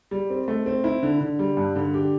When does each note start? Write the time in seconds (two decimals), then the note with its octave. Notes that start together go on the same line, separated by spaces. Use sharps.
0.11 G3
0.30 C4
0.48 A3
0.66 C4
0.84 E4
1.03 D3
1.21 D3
1.39 G3
1.57 G2
1.76 D3
1.94 G4